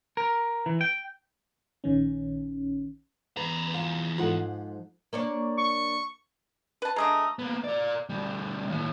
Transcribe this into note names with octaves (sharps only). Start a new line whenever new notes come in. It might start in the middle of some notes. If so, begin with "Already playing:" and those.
A#4
E3
G5
A#1 D#3 C#4
E2 B4 A#5
F3 F5
G#2 F3 F4 A4 F#5
A#3 D4 C#5
C#6
B4 A5
G#3 A3 D4 A#5 D#6
A#3 B3
A#4 D5
D2 G3
D#2 A2